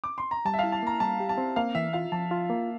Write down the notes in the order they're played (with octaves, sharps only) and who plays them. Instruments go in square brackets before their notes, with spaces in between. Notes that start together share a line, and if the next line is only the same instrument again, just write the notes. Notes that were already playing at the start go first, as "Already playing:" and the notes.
[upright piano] D6
C6
A#5
[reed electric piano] G3 [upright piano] A5
[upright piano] E5
[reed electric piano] E4 [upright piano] F5
[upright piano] A5
[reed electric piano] A#3 [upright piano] A#5
[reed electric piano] G3 [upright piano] A5
[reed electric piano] G4
[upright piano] A5
[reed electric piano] C4
[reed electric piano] A#3 [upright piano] F5
[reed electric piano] E3 [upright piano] E5
[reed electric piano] F4 [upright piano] F5
[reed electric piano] F3 [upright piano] A5
[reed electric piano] F4
A#3